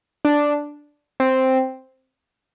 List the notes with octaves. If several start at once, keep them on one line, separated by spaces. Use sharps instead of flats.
D4
C4